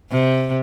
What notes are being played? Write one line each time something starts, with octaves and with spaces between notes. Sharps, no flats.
C3